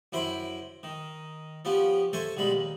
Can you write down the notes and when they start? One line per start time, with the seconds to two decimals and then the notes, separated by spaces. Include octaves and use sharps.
0.13 F#2 E4 C5 G5 B5
0.83 D#3
1.65 F3 B3 C#4 G4
2.13 A4 C5 E5 G#5 C#6
2.37 B1 G3 G#3 B5
2.52 D#2